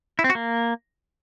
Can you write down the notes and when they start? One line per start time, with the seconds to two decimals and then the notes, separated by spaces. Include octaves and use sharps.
0.19 E4
0.24 C4
0.30 F#4
0.35 A#3